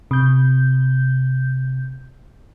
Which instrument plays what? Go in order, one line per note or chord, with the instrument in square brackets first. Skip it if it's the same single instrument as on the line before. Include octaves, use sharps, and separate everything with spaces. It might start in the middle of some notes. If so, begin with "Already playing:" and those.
[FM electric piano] C3 G6